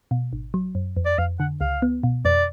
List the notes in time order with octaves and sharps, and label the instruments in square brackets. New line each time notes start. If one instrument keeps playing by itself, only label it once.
[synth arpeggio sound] B2
G#1
F#3
F#2
F2
[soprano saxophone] D5
[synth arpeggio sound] F2 [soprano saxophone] F5
[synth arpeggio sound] D3 [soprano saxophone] F#5
[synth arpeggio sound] C#2 [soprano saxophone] F5
[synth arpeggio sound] B3
B2
[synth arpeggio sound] F2 [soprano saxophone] D5